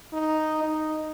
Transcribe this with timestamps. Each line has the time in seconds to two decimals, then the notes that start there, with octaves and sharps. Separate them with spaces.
0.13 D#4
0.63 D#4